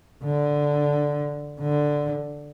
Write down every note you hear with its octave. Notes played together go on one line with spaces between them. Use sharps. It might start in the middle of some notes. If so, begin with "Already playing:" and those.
D3
D3